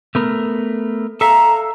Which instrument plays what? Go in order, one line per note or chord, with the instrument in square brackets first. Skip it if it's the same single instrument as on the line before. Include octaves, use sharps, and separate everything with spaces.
[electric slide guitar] A3 B3 A#4
[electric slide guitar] A4 E5 F5 [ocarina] A#5